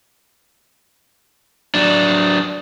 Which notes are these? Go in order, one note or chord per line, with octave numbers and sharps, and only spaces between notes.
F#3 D4